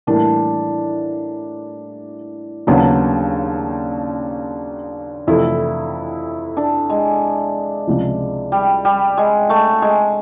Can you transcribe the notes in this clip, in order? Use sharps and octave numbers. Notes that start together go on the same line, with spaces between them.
A2 E3 G3 A#3 D4
D#2 C#3 F#3 B3 D4
F2 C3 E3 A3 E4
D4
G#3
C#2 C3 F3
G3
G3
G#3
A3
G#3